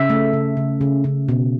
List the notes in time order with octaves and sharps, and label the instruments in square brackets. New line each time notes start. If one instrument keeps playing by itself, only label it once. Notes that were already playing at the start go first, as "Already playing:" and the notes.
Already playing: [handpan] C#3 E5
A3
C#3
C#3
C#3
C#3
B2